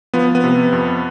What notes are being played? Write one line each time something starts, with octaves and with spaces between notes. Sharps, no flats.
F3 B3
B3
C3
F2